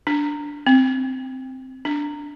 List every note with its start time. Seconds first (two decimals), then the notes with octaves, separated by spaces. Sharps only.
0.07 D4
0.67 C4
1.85 D4